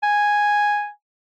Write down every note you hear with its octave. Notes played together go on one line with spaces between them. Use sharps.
G#5